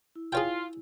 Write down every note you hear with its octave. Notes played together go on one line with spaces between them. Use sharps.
E4
F4 G#4 C#5 G5